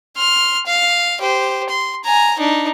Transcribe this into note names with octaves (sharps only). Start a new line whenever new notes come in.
C6 F6
F5
G4 C5
C6
G#5 A#5
D4 D#4